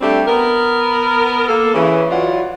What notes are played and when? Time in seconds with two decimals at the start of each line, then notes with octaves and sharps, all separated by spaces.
0.01 G3 A3 C4 D4 G4
0.27 B3 A#4
1.48 A#3 A4
1.74 C#3 E3
2.10 E3 F#3 F4 D5 F#5